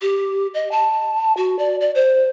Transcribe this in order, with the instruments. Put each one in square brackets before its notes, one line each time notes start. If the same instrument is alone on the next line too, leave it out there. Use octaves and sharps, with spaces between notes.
[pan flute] G4
D#5
A5
F#4
D5
D5
C5